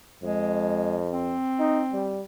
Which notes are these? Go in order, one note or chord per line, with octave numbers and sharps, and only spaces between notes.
F2 G#3
C4
D#4
G3